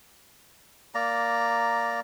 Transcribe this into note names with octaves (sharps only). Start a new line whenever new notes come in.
A#3 D5 A#5